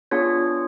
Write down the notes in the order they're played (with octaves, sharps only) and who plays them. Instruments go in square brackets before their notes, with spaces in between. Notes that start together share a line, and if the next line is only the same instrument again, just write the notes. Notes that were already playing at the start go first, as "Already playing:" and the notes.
[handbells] B3 D4 F4 G#4 C#5